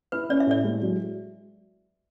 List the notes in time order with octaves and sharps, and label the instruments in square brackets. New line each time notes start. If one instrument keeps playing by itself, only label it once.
[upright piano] E4 [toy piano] B4
[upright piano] C#4 [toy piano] D5
[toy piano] E5
[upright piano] A2 [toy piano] D5
[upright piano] G#3
F#3